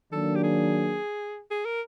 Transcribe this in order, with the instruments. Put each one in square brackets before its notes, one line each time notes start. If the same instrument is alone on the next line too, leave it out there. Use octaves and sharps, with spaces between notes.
[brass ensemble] D#3 F#3 A#3 D4 [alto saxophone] A4
[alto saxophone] G4
G#4
G#4
A#4